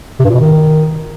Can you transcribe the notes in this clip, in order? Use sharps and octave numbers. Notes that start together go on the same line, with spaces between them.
C3
G2
A#2
B2
D#3